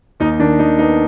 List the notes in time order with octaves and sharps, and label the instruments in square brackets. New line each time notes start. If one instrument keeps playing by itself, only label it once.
[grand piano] D#2 D#4
D#3 D4
D#3 D#4
B3 D#4